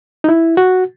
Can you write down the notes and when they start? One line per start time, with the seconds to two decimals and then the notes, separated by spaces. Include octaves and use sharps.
0.24 D#4
0.29 E4
0.57 F#4